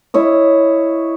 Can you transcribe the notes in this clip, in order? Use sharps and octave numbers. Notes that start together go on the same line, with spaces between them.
E4 C#5 D#5